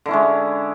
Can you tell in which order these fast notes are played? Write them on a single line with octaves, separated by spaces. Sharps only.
D3 E4 C#4 G#3